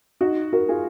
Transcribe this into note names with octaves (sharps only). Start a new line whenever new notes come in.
D#4 F#4
F#4 A#4
F4 G#4